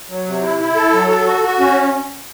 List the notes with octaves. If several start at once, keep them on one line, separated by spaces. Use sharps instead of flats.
F#3
C3
E4
E4
A4
F#3
A4
F#4
F#4
C#4